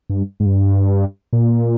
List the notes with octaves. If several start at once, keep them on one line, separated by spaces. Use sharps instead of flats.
G2
G#2
G2
A#2